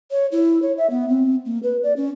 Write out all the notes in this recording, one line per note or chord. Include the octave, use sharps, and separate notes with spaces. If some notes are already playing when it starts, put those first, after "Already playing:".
C#5
E4
C#5
E5
B3
C4
A#3
B4
D5
C#4